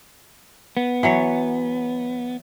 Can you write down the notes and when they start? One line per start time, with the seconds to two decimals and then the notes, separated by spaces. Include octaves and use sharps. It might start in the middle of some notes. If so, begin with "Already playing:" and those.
0.77 B3
1.03 E3 F#3 C#5